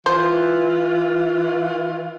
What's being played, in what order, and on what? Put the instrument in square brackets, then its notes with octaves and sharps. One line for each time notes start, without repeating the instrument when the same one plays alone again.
[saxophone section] E3 F4 [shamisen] C5